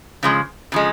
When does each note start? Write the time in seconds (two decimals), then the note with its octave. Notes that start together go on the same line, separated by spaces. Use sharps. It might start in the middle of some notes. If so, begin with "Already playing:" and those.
0.23 C#3 F3 G#3
0.72 C#3 F3 G#3